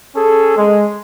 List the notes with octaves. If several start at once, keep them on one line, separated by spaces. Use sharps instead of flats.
C#4 G#4 A4
G#3